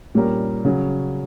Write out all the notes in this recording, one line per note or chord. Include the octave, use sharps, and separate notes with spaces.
A#2 G3 C#4 G4 A#4
C#3 F#3 C#4